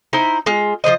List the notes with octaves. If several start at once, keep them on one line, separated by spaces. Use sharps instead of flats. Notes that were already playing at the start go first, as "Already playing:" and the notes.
D#4 E4 C5
G#3 F4
F3 F#3 C5 D#5